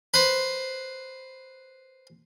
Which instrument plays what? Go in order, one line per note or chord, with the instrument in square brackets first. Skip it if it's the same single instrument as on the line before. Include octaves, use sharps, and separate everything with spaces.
[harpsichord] B4 C5